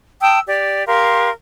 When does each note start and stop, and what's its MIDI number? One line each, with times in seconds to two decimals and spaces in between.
0.21 0.38 79
0.21 0.38 81
0.21 0.38 87
0.21 0.38 88
0.46 0.84 67
0.46 0.84 74
0.87 1.30 67
0.87 1.30 70
0.87 1.30 77
0.87 1.30 84